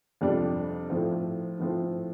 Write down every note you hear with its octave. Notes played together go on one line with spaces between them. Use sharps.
F2 C3 G3 D4 F4
A2 F3 C4 F4
A2 F3 C4 F4